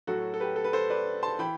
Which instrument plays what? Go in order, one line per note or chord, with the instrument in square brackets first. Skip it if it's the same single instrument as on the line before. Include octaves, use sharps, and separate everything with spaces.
[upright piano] A2 F#3 F#4 A4
A4
G4 B4
A4
B4
A4 C5
B4 D5
A5 C6
E3 G5 B5